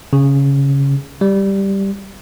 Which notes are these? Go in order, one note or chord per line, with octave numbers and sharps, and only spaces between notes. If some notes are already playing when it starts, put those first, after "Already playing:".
C#3
G3